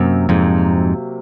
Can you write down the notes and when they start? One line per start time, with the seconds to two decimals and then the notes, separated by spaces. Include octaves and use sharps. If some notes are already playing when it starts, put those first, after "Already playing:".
Already playing: F#2 C3 F#3 A#3
0.29 F2 G#2